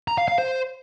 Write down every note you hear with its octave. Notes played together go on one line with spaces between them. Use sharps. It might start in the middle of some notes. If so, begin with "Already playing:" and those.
A#5
F5
F5
C5